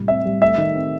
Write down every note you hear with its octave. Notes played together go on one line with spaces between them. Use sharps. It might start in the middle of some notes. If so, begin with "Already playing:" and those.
Already playing: A2 C3 G3
C4 E5
G3
A3 E5
D#3
C4